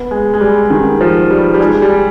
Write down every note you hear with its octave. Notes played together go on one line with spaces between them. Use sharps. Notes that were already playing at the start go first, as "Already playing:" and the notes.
Already playing: B3
G#3
G#3
G3
D#3
F3
G3
G3
G#3
G3